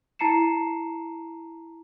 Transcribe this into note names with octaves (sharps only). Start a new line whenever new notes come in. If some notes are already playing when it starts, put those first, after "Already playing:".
E4 A5 A#5 C7 C#7 E7